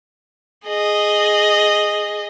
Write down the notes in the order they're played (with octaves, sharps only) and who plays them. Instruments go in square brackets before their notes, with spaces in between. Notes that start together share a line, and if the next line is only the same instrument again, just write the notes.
[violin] G#4 D#5